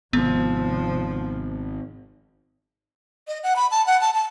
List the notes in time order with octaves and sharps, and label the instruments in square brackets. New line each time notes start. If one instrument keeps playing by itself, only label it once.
[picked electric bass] G#1 [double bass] C3 F3 [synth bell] B3
[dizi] D#5
F#5
B5
A5
F#5
A5
A5